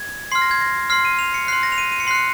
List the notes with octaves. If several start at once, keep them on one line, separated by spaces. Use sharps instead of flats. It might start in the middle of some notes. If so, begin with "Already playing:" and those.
Already playing: G#6
C6 F6 C7
A#6
G#6
A#6
C6 F6 C7
D#7
F7
C#7
C6 F#6 C7
A#6
F7
D#7
D#7
C#7
C6 F#6 C7 C#7